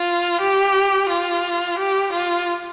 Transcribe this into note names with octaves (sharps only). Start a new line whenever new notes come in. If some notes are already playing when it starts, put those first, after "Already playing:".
Already playing: F4
G4
F4
G4
F4